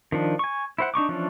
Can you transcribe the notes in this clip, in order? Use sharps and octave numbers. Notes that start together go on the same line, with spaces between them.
D#3 F3 D4
G#5 C#6
E4 C5 F#5
D4 D#4 C#6 D6
E3 F3 C#4 D4